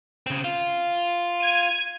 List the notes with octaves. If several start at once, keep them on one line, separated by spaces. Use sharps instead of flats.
C#3 C4
F4
G#6 D#7